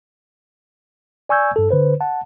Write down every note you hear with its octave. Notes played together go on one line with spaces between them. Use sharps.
D5 G#5 C#6 E6 G6 G#6
G2 A4
D3 B4 C5
F#5 A5